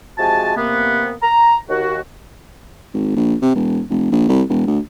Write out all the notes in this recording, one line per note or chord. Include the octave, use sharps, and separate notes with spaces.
C3 F3 G#3 F#4 G#5 A5
C3 A#3 B3
A#5
D#2 F#4
G#1
A#1
C3
E1
F1
A#1
C2
E1
D2